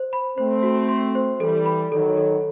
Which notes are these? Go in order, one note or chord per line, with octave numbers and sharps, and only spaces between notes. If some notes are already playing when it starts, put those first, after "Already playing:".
Already playing: C5
B5
A3 C4 C5
F#4
C6
C5
E3 G3 A4
B5
D#3 F#3 A4
A4